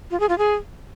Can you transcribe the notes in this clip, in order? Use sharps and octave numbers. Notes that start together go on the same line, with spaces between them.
F4
G#4
F4
G#4